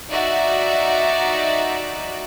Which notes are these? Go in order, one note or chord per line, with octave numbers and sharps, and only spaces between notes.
D#4 F#4 D5 E5